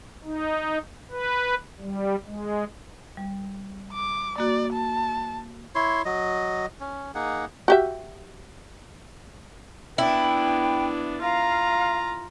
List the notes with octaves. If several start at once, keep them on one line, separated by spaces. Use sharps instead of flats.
D#4
B4
G3
G#3
G3
D6
A#3 F#4 D5
A5
E4 C#5 C6
F#3 D#5
C#4
A#3 D#4 G#4 F#5
F#4 G4 E5
B3 D4 E4 G5
F4 F5 A#5